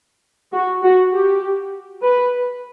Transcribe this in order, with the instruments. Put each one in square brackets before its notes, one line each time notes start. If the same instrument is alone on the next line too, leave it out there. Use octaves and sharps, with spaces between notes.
[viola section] F#4
F#4
G4
B4